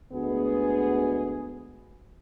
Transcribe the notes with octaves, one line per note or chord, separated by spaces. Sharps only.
D2 G#3 B3 G#4